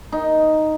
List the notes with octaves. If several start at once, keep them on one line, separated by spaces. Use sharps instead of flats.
D#4